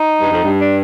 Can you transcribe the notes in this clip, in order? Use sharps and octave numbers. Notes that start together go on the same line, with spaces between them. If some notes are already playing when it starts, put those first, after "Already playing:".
Already playing: D#4
G2
F2
G2
D4